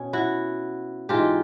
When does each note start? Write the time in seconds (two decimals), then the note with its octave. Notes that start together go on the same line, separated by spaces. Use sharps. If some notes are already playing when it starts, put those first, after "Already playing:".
Already playing: B2 C#4
0.13 E4 F#4
1.09 G#2 E3 G#3 F4 G4